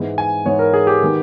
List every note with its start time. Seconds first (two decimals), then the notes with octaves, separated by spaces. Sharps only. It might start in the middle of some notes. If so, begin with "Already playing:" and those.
Already playing: G#2 E3 G#3 B3
0.18 G#5
0.45 G#2 E3 G#3 B3 C#5
0.59 A#4
0.74 G#4
0.87 G4
1.02 D#3 G#3 B3